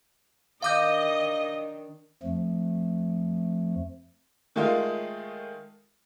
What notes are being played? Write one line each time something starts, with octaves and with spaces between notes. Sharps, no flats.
D#3 D4 D#5 F5 D6 G6
F2 F3 A3
D#3 G#3 A3 D#4 F4